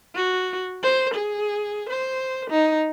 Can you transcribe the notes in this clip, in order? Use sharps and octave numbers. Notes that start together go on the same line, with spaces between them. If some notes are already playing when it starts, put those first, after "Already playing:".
F#4
C5
G#4
C5
D#4